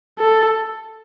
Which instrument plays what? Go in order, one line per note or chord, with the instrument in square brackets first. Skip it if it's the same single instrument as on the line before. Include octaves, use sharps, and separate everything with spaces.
[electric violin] A4